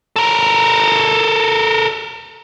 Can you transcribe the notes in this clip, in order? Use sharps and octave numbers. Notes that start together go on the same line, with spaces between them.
A4 A#4